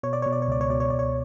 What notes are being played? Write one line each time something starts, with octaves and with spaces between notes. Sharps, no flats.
B2 C#5
D5
B2 C#5
D5
C#5
C#2 D5
C#5
B2 D5
C#5
C#2 D5
C#5